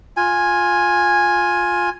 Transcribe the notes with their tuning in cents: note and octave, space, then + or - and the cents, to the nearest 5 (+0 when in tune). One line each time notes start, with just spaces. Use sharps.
F4 +15 G#5 +0